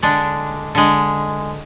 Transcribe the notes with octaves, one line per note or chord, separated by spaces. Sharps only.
D3 G#3 D4
D3 G#3